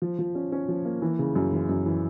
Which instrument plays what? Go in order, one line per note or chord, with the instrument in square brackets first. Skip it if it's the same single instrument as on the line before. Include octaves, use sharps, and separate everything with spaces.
[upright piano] F3
F3
C#4
C#4
F3
A#3
E3
C#3
F#2
E3
F#2
E3